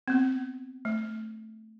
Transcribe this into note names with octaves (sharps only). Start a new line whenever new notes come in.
B3 C4
A3